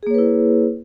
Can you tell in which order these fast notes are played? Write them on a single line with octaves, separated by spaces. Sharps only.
G#4 A#3 C#5 B4 E4